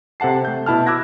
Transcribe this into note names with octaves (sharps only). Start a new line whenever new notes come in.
C3 A4 F#5 A5 C7
A3 G6
B2 E4 A5 F6
D6 E6 F#6 G#6 A#6